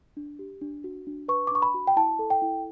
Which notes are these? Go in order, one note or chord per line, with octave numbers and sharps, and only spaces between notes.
D4
G4
D4
F#4
D4
B4 C#6
D6
D4 C#6
B5
F#4
G5
E4 A5
A4
G5
E4